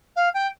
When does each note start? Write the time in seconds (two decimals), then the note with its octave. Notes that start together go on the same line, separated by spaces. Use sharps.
0.16 F5
0.34 G5